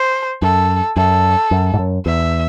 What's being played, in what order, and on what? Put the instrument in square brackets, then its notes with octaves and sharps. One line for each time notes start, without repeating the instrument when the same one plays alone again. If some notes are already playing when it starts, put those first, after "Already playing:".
Already playing: [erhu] C5
[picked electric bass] F#2 [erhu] A4
[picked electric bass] F#2 [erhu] A4
[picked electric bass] F#2
G#2
F#2
[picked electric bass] E2 [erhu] E5